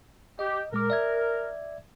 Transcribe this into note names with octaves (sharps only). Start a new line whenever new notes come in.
G4 D#5
A#2 G#3 A#4 D6
D5 E5 G#6